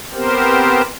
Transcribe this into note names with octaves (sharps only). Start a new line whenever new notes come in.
B3 C4 G4 A#4 C5